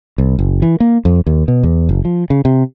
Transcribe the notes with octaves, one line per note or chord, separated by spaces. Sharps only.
C2
F#1
E3
A#3
F2
D#2
B2
E2
F#1
F3
C#3
C3